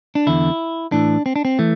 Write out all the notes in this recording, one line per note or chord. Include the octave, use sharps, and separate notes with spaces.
D4
E2 D3 E4
A2 E3 D4
C4
D4
C4
E3 A3